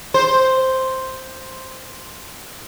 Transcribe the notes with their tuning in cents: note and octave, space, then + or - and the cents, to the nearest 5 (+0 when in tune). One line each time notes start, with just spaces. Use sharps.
C5 +0